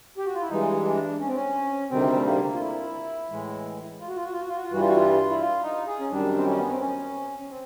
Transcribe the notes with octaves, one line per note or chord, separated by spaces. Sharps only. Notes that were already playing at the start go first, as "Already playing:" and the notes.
G4
F#4
F4
E4
G2 E3 G#3 D#4
D4
C#4
C4
C#4
D2 C3 D#3 G3 C4
A3
A#3
F4
E4
A2 E3 G#3
F4
F#4
F4
F#4
F4
F#4
F4
F#4
F4
G2 E3 G3 F#4
F4
F#4
F4
E4
F4
D#4
G#4
C#4
F#2 D#3 G3 D4
C4
C#4
B3
C4
C#4
C#4
C4